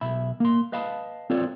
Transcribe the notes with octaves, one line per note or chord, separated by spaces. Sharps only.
B1 E5 B5
A#3 C6
B4 D#5 F5 A5 B5
C4 F4 A4 C#5 D5